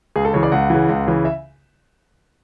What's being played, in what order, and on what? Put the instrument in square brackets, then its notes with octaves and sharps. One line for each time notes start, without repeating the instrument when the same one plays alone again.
[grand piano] C#2 G#4
A4
C#3 E3 C#5
D5
C#2 F#5
C#3 E3
C#2
C#3 E3
E5